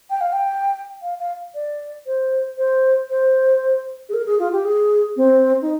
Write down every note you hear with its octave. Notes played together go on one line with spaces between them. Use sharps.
G5
F5
G5
F5
F5
D5
C5
C5
C5
G#4
A#4
G#4
F4
G4
G#4
C4
D#4